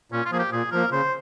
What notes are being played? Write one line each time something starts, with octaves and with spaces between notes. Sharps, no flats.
A#2 C#4
F4
F3 A#3 G#4
G4
A#2 G#4
F3 A#3 A#4
C#3 C5